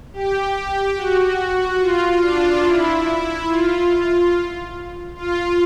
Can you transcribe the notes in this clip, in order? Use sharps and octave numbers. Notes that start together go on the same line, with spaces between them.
G4
G4
F#4
F4
D4
E4
F4
F4